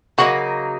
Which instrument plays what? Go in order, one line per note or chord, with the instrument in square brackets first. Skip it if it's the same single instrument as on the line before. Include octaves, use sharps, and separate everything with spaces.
[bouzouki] C#3 F#3 A#3 D#4 [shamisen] F#4